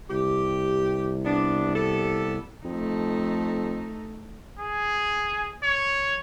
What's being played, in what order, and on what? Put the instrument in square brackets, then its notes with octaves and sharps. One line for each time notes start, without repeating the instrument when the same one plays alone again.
[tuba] C2 [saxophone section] G4
[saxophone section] B3 D4
B3 G4 A4
[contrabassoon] F2 [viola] A3 D#4
[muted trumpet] G#4
C#5